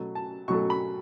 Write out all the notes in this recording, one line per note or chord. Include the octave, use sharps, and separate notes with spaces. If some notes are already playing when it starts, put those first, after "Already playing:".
Already playing: B2 F#3 A3
A5
B2 F#3 A3 C#6
B5